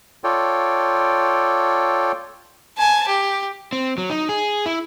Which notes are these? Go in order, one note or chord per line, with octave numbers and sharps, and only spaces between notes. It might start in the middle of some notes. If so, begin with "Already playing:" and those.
F4 A4 C#5 D5 G5
G#5 A5
G4
C4
F#3
D#4
G#4
E4